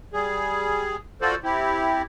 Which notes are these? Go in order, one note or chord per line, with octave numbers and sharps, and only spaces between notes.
G3 G#4
F4 F#4 A4 C5 D5
C4 E4 G4